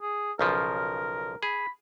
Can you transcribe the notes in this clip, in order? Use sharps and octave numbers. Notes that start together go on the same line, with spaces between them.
G#4
B1 C#3 F3 A#4
G#4 B5